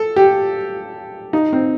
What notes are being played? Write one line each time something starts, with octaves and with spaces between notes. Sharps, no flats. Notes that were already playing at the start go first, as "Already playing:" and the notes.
Already playing: A4
G4
D#4
C4